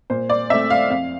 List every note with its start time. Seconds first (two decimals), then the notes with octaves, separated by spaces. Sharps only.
0.10 A#2 C5
0.30 D5
0.50 A3 C4 E5
0.70 F5
0.90 F2 F5